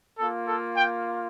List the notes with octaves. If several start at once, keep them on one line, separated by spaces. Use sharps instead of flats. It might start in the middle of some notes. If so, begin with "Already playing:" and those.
A#3 F4 A4
A4
G5